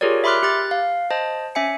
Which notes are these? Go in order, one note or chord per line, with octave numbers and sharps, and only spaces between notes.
F4 G4 G#4 A#4 C#5 D5
E5 B5 C6 D6 F6 F#6
G4 F#6 A6
F5
C5 D#5 A5
C#4 E5 G#5 C#7